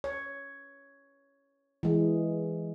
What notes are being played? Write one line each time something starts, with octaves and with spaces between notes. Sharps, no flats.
C#5
E3 G#3